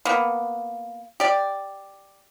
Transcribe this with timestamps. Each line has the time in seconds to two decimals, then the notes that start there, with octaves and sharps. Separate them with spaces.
0.05 A#3 B3
1.20 G4 D5